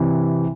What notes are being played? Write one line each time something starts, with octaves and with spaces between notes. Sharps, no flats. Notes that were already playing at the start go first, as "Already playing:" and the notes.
Already playing: C3 E3